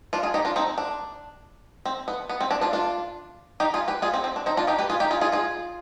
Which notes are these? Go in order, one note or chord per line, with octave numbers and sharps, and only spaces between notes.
D4 F4
F4 G#4
D#4 G4
D4 F4
C4 D#4
D4
C4
B3
B3
C4
D4
D4 F4
D4 F4
D#4 G4
F4 G#4
G4 B4
F4 G#4
C4
C4
D4
C4 D#4
D4 F4
D#4 G4
G4 B4
F4 G#4
D#4 G4
F4 G#4
F4 G#4
F4 G#4